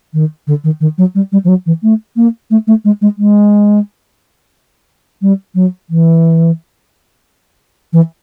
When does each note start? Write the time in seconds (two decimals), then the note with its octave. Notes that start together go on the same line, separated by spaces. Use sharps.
0.13 D#3
0.47 D3
0.64 D#3
0.80 D#3
0.98 F#3
1.15 G3
1.32 G3
1.44 F3
1.48 F#3
1.66 E3
1.83 A3
2.16 A#3
2.50 A3
2.67 A3
2.84 G#3
3.01 G#3
3.18 G#3
5.22 G3
5.55 F#3
5.90 E3
7.93 E3